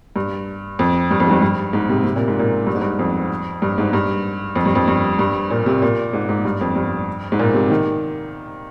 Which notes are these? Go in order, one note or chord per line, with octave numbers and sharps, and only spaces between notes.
G2
F2
G2
F2
G#2
G2
G2
G#2
C3
C3
A#2
G#2
A#2
G2
G#2
G2
F2
G2
G#2
G2
F2
G2
F2
G2
G2
A#2
C3
A#2
G#2
G#2
G2
F2
G2
G#2
A#2
C3
D#3